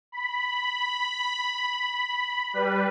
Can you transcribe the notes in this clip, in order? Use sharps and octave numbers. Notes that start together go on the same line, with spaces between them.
B5
G3 B4